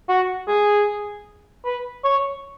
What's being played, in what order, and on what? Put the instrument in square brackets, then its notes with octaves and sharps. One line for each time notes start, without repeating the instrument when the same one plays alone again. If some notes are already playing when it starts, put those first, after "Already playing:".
[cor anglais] F#4
G#4
B4
C#5